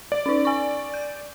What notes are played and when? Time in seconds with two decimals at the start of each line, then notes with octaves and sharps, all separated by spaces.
0.12 D5
0.26 C#4 D#4
0.45 G#5 C#6
0.94 G6